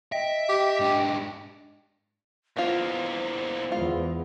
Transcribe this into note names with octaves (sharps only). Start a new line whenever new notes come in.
D#5 E5 G5
G4
G#2 D4
E2 A#3 B3 F4 C5
E2 G#3 F4